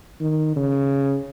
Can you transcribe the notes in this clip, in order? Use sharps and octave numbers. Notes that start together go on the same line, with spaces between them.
D#3
C#3